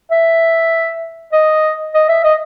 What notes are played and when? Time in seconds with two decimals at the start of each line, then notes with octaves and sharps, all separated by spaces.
0.11 E5
1.33 D#5
1.94 D#5
2.09 E5
2.24 D#5